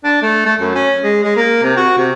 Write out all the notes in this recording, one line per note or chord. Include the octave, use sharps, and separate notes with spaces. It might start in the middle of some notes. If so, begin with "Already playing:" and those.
D4
A3
A3
F#2
C#4
G#3
G#3
A#3
C3
F#4
C3